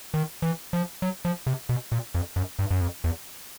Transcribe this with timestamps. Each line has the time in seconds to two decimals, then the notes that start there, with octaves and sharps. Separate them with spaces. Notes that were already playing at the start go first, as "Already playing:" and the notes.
0.14 D#3
0.42 E3
0.73 F3
1.02 F#3
1.25 F3
1.47 C3
1.69 B2
1.92 A#2
2.15 F2
2.36 F#2
2.59 G2
2.71 F#2
2.81 F2
3.04 E2